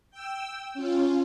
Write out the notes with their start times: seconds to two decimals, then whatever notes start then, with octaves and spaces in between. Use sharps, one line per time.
0.11 G5 E6
0.74 C#4 F4